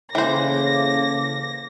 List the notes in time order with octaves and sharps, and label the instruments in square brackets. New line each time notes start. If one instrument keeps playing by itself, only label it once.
[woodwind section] A2 A#3 D6 [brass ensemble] C#3 [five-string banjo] E3 C5 [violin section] A#6